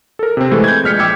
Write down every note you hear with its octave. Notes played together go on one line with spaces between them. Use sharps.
A4 A#4
C3 C4
E3 G#3 A3 A4
G6 G#6
A#1 G#3 F6 B6 C#7
G5 D6 E6 F6 G#6